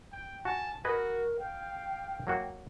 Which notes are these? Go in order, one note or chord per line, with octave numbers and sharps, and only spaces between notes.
G5
F#4 G#5 A5
F#4 A#4 B4 D#5 G#5
F5 G5
F#3 A#3 F#4